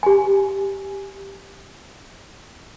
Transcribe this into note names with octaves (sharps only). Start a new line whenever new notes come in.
G4 G#5